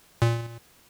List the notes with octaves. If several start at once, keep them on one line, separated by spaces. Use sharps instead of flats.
A#2